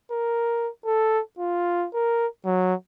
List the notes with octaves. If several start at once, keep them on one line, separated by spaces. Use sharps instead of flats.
A#4
A4
F4
A#4
F#3